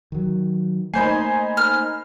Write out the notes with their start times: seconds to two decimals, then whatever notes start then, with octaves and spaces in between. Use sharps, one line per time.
0.12 D#3 F#3
0.94 A3 A#3 D#4 C5 G#5 B5 G6 C7
1.57 F6